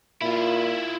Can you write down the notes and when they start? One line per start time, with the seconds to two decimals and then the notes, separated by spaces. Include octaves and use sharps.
0.22 A#2 E4 F4